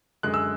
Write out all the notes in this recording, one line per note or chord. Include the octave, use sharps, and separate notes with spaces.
F#2 D3 G#3 F#6
E6